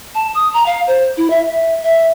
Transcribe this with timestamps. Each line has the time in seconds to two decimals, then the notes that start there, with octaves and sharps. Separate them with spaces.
0.15 A5
0.35 D#6
0.54 A#5
0.66 F5
0.87 C5
1.17 E4
1.30 E5
1.48 E5
1.83 E5